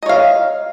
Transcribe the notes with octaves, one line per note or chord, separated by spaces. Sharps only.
C#5 D#5 F5